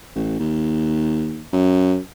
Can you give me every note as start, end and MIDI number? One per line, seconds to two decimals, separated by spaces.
0.15 0.35 33
0.40 1.45 39
1.53 1.98 42